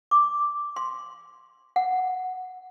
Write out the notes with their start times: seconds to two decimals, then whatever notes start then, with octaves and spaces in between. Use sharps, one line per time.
0.11 D6
0.76 C6
1.76 F#5